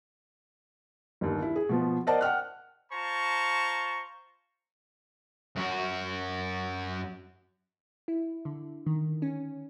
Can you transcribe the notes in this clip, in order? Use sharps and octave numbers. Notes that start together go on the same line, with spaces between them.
G1 D#2
E4
G#4
B2 F3 B3
A#4 C5 D5 D#5 F#5 A5
F#5 G5 F6 F#6
F4 C5 A5 A#5 C#6
F#2 F#4
E4
D3
D#3
C#4